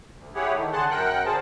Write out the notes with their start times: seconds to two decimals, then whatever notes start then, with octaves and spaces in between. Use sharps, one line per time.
0.16 D2
0.35 E4 G4 G#4 C#5 F#5
0.54 D#3 A3
0.72 D3 G#4 F#5 A5 C6 F#6
0.90 F#2 A#4 F#5 G5 F#6
1.26 D3 G#4 C5 A5